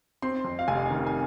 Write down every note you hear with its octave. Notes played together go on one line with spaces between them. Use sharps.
C4 C6
F2
F5
F1 G#5
D#3
G#5